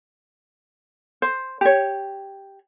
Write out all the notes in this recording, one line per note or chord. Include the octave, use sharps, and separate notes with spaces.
C5
G4 C#5